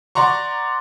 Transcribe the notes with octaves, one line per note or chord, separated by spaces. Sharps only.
D5 F#5 A#5 C6 C#6